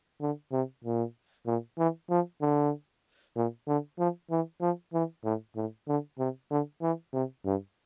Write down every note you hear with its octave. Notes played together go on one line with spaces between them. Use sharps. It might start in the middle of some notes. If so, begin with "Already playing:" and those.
D3
C3
A#2
A#2
E3
F3
D3
A#2
D3
F3
E3
F3
E3
A2
A2
D3
C3
D3
E3
C3
G2